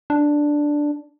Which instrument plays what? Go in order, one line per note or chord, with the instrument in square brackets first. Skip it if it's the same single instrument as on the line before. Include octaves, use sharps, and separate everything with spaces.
[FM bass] D4